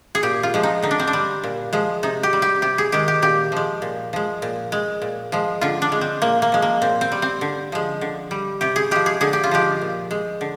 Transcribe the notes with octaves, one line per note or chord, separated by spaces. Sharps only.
G#4
A#2 G4
F4
F3 G#3
D#4
D3 D#4
D4
C4
D4
G3
A#2
F3 G#3
C3 D#4
G4
G3
G4
C3 G4
G#4
D#3 G#3 G4
G4
A#2 G4
F3 G#3
A#2
F3 G#3
A#2
G#3
A#2
F3 G#3
D3 F4
D4
G#3
C4
A#2 A#3
A#3
F3 G#3
A#3
A#2 C4
C4
G3
C4
D3
F3 G#3
D3
G3
C3 G4
G#4
F3 G#3 G4
G#4
D3 G#4
G4
F4
F3 G#3 G4
A#2
G#3
D3